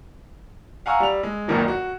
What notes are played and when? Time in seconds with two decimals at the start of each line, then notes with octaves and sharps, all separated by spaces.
0.86 F5 F#5 G#5 A#5 C#6 E6
1.00 G3 F7
1.23 G#3
1.48 G#1 C#2 F#2 A#2 D#3 F#3
1.68 F#4